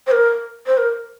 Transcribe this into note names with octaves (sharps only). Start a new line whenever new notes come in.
C5
A#4
C5
A#4